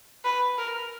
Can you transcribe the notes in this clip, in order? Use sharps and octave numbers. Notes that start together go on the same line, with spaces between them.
B4
A#4